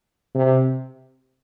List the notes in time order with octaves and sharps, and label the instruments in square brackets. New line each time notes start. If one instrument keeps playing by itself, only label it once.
[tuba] C3